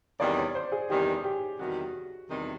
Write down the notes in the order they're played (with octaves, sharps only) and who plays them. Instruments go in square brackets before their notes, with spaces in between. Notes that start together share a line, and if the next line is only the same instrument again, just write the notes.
[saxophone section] E2 C3 D#3 G3 [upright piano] D5
[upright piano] C#5
C5
G#4
[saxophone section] E2 C3 D#3 G3 [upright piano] G4
[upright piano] G4
[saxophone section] E2 C3 D#3 G3 [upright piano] F#4
[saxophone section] E2 C3 D#3 G3